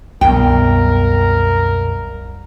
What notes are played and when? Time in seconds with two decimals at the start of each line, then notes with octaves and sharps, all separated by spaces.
0.21 C2 F#2 B2 A#4 G5